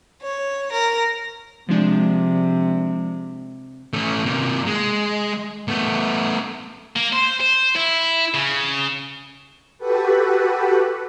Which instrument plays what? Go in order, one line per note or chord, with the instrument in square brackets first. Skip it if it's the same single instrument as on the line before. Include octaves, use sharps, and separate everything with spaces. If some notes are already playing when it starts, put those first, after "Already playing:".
[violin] C#5
A#4
[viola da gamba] C3 [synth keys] F3 G#3 D4
[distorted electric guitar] A3 C#4
C3 A#3
G#3
A3 B3
A#3
C5
C5
E4
C#3
[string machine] F#4 G4 A4 B4